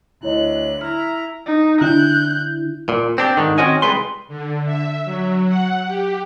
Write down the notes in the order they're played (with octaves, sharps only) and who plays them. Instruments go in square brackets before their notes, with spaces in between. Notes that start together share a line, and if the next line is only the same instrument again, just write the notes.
[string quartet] D2 F#6 [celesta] E4 C#5 D#5
[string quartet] E4 A#5 [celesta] F6
[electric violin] D#4
[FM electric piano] D3 D4 E4 [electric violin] F#6 G6
[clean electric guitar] A#2
C4 D4 G4
G#2 D3 D#3
D#3 C4 C#4 F#4 D#5 G#5
C2 G3 G#3 B4 C6
[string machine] D3
E5
F#3
F#5
G4